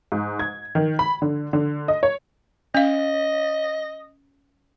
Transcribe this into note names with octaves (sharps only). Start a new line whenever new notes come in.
G#2
G#6
D#3
B5
D3
D3
D#5
C#5
C#4 D#5 F5